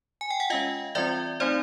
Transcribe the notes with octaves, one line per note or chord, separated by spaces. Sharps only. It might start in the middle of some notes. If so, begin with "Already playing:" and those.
G#5
G5
F#5
G#3 C#4 F4 D#5 F5
E3 G3 C4 F4 D5 E5
A3 C4 D#4 C5 D5